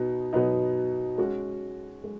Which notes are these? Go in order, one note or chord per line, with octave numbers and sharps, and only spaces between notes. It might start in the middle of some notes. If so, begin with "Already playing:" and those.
Already playing: B2 B3 D#4
B2 F#3 B3 D#4
G#3 C#4 F#4
G#3